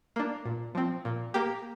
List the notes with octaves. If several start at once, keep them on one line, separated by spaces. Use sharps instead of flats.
A#3 D4
A#2
F3 C4
A#2
A#3 G4